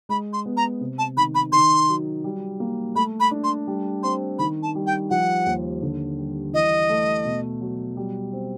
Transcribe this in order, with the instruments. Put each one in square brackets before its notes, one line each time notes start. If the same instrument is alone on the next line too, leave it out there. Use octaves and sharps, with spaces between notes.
[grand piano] G#3 [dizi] B5
[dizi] C6
[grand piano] B3
[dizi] A#5
[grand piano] C3
[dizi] A5
[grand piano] D#3 [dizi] B5
[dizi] B5
[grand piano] D#3 [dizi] C6
[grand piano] F#3
G3
A#3
[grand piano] A3 [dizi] B5
[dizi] B5
[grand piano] D4
[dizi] C6
[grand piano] G3
[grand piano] C4 [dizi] C6
[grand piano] D#3 [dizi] B5
[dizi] A5
[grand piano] G3
[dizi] G5
[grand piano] F3 [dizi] F#5
[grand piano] D#2
D3
G3
[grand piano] E3 [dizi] D#5
[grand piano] A3
B2
F#3
G3
C4